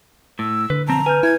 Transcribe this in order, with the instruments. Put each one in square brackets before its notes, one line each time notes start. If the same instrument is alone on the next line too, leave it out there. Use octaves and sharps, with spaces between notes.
[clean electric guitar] A2 [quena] E6
[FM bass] D3 [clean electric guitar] B4
[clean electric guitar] B1 F2 C4 [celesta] A5 [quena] A#5
[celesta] B4 F6 G6 [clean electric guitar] G#5
[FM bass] E4 [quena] G#6